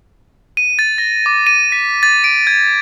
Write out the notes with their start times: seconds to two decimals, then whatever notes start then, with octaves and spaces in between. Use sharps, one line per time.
0.57 D#7
0.79 A6
0.98 A#6
1.26 D6
1.47 D#7
1.72 B6
2.03 A6
2.24 D7
2.47 G#6